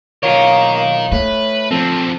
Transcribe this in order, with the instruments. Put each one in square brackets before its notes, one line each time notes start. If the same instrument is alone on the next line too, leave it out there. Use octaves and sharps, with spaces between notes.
[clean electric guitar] B1 F4 C#5 [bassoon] A#3 [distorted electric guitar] A#4 D#5
[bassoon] A2 [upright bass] A3 [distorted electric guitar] B4
[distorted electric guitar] D3 F3 [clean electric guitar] C4 [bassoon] A4